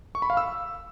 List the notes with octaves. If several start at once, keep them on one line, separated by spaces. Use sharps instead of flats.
C#6
B5
F5
E6